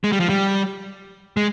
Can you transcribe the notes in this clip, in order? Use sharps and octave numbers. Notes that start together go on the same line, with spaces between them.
G#3
G3
F3
G3
G#3